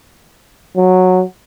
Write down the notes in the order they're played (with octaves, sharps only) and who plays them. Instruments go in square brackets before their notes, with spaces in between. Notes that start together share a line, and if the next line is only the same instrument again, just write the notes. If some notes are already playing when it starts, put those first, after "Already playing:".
[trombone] F#3